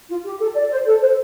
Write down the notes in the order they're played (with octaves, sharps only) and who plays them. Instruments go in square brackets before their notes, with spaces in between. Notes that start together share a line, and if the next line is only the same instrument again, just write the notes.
[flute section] F4
G4
A4
D5
C5
A4
C5